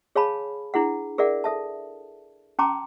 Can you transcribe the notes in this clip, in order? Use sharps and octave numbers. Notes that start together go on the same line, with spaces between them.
G#4 C#5 F5 G#5 A5 B5
D4 E4 G#4 F#5
G#4 A#4 D5 E5 F#5
A4 E5 A5
C#4 G5 A5 A#5 C6 D6